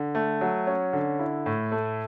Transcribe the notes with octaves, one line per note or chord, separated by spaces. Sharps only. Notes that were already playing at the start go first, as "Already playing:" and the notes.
Already playing: D3
A3
F#3
C#4
D3
E4
A2
A3